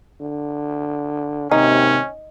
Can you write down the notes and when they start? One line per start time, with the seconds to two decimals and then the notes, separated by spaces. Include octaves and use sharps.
0.21 D3
1.52 G#1 D#2 C3 D#3 C#4 D#4